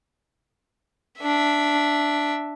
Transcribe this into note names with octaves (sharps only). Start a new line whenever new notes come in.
D4 E5